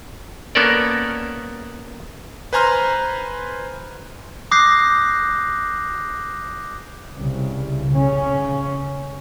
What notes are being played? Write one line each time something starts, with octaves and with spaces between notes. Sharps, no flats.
A#3 B3 C#4 A4 A#4 D5
B4 C5 G#5 A#5 C6 F6
D6 D#6 F#6 G6 A#6 C7
C2 C#3
C#3 C#4